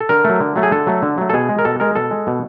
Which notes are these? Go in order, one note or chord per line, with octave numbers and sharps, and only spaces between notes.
A4
D3 A#4
F#3 A3
D3
F#3 A3
G#4
D3 A4
F#3 A3
D3
F#3 A3
A4
B2 G#4
G#3
A#4
B2 A4
G#3 A#4
B2 A4
G#3
B2